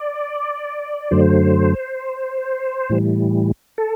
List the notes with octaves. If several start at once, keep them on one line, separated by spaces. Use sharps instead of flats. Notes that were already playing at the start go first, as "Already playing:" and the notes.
Already playing: D5
F#2 D3 F#3 A3 C5
A2 E3 G3
A4